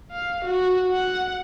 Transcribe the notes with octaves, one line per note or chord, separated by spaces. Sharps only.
F5
F#4
F#5